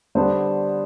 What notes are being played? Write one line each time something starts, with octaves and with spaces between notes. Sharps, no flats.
D3 G3 B3 D4 C5